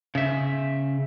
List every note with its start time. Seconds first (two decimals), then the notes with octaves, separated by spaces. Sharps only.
0.15 C#3 E5